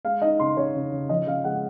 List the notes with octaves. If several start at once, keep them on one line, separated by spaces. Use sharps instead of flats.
G#3 F5
D#4 D#5
C#3 C6
C#3 C#5
C#3
C#3
F3 D#5
C#3 F5
G#3 F#5